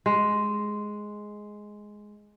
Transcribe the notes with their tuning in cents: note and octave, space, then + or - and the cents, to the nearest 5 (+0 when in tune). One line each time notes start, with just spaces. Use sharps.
G#3 +5